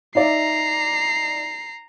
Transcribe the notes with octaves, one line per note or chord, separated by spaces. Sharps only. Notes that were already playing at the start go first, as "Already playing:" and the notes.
D#4 D5 E5 A#5 C7